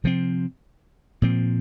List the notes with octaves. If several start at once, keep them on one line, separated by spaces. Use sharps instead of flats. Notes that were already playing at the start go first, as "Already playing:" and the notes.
C3 F3 C4
A#2 F3 C4